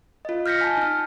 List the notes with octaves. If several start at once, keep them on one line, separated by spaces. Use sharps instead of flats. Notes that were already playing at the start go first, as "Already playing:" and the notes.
F4 D#5
F6 G6 A#6 B6 C#7
G#5 A5
D#4 F6